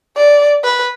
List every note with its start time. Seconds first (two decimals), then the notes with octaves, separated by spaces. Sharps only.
0.17 D5
0.64 B4